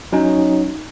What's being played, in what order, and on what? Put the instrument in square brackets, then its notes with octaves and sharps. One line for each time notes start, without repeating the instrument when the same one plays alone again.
[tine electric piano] F#3 C#4 D#4